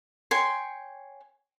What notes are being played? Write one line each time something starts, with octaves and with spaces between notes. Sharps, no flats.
C#5 G5 G#5 C6